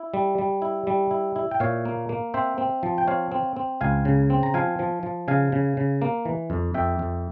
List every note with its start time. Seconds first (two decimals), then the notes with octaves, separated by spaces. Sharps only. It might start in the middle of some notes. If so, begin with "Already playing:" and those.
Already playing: E4
0.14 G3
0.38 G3
0.62 E4
0.87 G3
1.11 E4
1.36 E4
1.51 G5
1.60 A#2 C#5 F5
1.85 A#3
2.09 A#3
2.34 C4 C5 E5
2.58 C4
2.83 F3
2.98 G5
3.07 C4 C#5 F5
3.32 C4
3.56 C4
3.81 C#2 F5 G#5
4.05 C#3
4.30 C4
4.43 A#5
4.54 F3 F5 G#5
4.79 F3
5.03 F3
5.28 C#3 F5 G#5
5.52 C#3
5.77 C#3
6.02 A#3
6.25 E3
6.50 F2
6.74 F2 E5 G5
6.99 F2